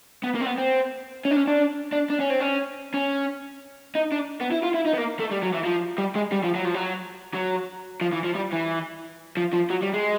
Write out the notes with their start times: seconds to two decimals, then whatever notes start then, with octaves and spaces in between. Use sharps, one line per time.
0.24 B3
0.35 A#3
0.41 C4
0.46 B3
0.58 C4
1.25 C#4
1.31 D4
1.37 C#4
1.47 D4
1.93 D4
2.10 D4
2.20 C#4
2.30 C4
2.41 C#4
2.94 C#4
3.95 D#4
4.12 D4
4.41 B3
4.52 E4
4.63 F4
4.74 E4
4.86 D#4
4.93 B3
4.97 A#3
5.19 A3
5.31 G3
5.42 F#3
5.54 E3
5.65 F3
5.98 G3
6.15 G#3
6.32 G3
6.44 F3
6.55 F#3
6.65 F3
6.74 F#3
7.34 F#3
8.01 F3
8.13 E3
8.24 F3
8.35 G3
8.52 E3
9.37 F3
9.53 F3
9.70 F#3
9.82 G3
9.93 G#3